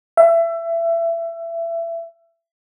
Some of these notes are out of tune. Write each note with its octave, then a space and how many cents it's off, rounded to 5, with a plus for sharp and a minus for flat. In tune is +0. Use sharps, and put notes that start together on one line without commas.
E5 +25